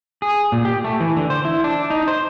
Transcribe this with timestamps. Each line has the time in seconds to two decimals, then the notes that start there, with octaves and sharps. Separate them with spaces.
0.22 G#4
0.52 A#2
0.65 G4
0.84 A3
1.00 E3
1.17 D3
1.30 C5
1.45 E4
1.64 D4
1.90 D#4
2.08 C5